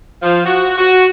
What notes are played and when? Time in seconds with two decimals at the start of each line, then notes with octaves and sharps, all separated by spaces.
0.22 F3
0.46 F#4
0.78 F#4